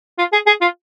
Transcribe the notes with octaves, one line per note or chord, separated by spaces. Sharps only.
F4
G#4
G#4
F4